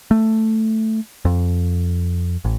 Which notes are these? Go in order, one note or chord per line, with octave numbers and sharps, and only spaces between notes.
A3
F2
A1